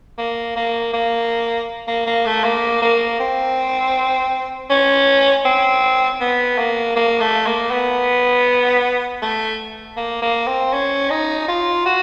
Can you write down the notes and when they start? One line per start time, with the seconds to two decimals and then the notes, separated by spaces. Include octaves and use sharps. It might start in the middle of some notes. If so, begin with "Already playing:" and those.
0.18 A#3
0.56 A#3
0.93 A#3
1.87 A#3
2.06 A#3
2.26 A3
2.44 A#3
2.82 A#3
3.20 C4
4.70 C#4
5.45 C4
6.21 B3
6.58 A#3
6.96 A#3
7.21 A3
7.46 A#3
7.71 B3
9.22 A3
9.97 A#3
10.22 A#3
10.48 C4
10.73 C#4
11.10 D#4
11.48 F4
11.86 F#4